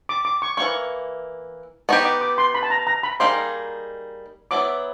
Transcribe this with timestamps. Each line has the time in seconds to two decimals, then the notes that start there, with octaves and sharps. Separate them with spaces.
0.09 D6
0.25 D6
0.42 C#6
0.57 E3 G3 A#3 C#6
1.89 B3 D#4 G4 C#6
2.05 D6
2.21 D6
2.38 C6
2.55 B5
2.63 A5
2.70 A#5
2.87 A#5
3.03 B5
3.20 G3 A#3 D#4 G#4 C6
4.51 F#3 B3 E4 D6